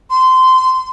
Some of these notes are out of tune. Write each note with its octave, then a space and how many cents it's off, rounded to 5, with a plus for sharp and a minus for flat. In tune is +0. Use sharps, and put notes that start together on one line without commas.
C6 -20